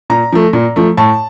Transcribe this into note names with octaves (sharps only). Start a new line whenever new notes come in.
A#2 A#5
F3 A3
A#2
F3 A3
A2 A5